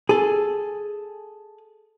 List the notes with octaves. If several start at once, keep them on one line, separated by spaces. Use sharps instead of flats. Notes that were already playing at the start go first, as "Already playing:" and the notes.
G#4 A4